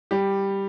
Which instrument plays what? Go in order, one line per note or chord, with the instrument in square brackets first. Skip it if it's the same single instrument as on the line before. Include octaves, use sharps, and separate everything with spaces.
[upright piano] G3 G4